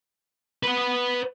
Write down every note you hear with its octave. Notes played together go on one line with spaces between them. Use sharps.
B4 F#5